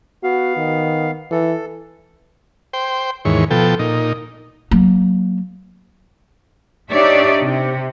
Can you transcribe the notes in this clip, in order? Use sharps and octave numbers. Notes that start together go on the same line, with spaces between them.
B3 F#4 F5
D#3
E3 A4
C5 G5
D#2 G#2 E3 C#5
B2 F3 A4 G5
A#2 D#4
F#3 A#3
D4 D#4 G4 C#5 D5 E5
C3